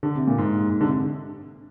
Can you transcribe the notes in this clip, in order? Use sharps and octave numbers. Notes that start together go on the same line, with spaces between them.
D3
C3
A#2
G#2
G#2
D3
C3